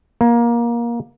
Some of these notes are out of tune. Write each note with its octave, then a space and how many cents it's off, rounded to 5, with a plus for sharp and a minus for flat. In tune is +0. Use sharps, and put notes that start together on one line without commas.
A#3 +20